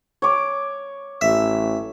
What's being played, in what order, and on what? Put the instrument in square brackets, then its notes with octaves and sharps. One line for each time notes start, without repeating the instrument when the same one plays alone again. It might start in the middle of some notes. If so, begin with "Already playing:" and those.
[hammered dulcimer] C#5 D6
[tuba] A1 [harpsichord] E5